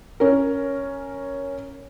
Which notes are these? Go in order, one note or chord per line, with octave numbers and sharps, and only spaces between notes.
C#4 A#4